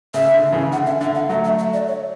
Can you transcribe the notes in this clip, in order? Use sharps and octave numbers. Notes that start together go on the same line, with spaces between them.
C#3 E5
D3
C#3 E3
D3 F#5
E5
D3 E5
F#5
F#3 A3 E5
E5
E5
D5
C#5